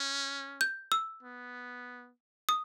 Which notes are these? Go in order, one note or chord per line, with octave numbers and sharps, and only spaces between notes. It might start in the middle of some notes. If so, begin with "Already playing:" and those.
Already playing: C#4
G6
E6
B3
D#6